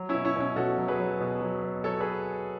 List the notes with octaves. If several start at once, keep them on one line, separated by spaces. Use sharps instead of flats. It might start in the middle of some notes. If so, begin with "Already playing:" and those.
Already playing: F#3
C#4 E4
B2
C#4 E4
B2 C#4
B2 F#4 A4
F#3
G#4 B4
F#3
B2
F#3
B2
F#3 A4 C#5
G#4 B4